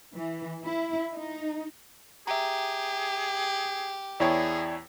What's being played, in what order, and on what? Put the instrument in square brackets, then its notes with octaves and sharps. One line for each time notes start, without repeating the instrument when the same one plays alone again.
[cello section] E3
E4
D#4
[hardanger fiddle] G4 [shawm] G#4 [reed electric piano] E5 A#5
[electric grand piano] E2 E4 C#5 [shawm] G#4 [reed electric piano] D5 G5 A5